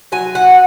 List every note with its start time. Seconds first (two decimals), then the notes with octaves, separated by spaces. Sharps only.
0.12 F#3 G#5
0.35 F#5